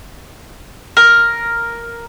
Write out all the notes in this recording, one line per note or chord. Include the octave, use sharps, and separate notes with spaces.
A#4